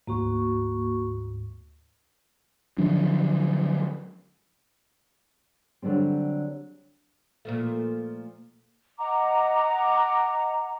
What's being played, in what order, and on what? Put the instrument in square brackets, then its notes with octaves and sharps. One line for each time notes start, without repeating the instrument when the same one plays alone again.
[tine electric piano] D2 G#2 [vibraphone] A#3 F#4 C#6
[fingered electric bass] D3 F3 F#3 D4
[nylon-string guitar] D3 F#3 G3 C4
[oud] A#2 F3 A3
[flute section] D#5 F#5 A#5 D6